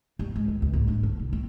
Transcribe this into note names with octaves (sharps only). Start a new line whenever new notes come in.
G2
G#3
D#3
C#2
G#2
D4
D3
C2
C4